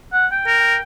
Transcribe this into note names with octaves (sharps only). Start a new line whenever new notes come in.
F#5
G5
A#4
G5